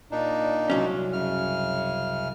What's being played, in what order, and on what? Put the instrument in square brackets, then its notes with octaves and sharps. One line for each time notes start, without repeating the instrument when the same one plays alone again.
[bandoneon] A#2 D4 D#4
[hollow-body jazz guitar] C2 F#3 C#4
[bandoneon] F#2 C#3 F6